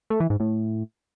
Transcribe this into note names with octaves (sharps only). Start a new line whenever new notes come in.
A3
E3
G#2
A2